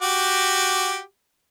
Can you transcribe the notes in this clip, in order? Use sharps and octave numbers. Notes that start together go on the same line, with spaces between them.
F#4 G4 D6